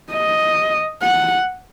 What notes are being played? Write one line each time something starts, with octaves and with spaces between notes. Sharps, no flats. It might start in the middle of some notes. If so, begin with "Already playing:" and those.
D#5
F#5